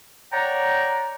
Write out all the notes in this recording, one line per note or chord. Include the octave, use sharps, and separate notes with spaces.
C#5 D5 F#5 G5 A#5